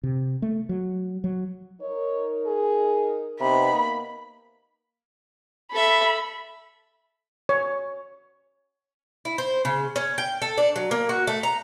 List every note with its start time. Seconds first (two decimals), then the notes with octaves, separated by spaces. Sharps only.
0.03 C3
0.42 A3
0.69 F#3
1.24 F#3
1.81 D#4 A#4 C#5
2.47 G#4
3.41 C3 B3 D#4 B5
3.74 A#3
5.73 A4 E5 B5
7.49 C#5
9.25 E4
9.38 C5
9.65 C#3
9.96 C#4
10.18 G5
10.42 A4
10.58 D4
10.76 F#3
10.91 A#3
11.09 F#4
11.27 A3
11.43 A#5